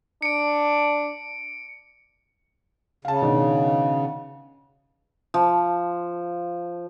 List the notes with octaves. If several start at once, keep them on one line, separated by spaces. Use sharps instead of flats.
D4 C#7 D7
C#3 F5 A5
B2 D#3 D4
F3